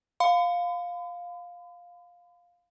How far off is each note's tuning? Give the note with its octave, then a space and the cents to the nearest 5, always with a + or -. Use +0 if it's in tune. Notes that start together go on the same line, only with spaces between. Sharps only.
F5 +10 B5 +45